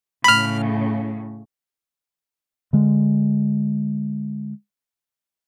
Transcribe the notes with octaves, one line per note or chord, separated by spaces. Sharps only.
A2 C#3 B5 F6
D3 G#3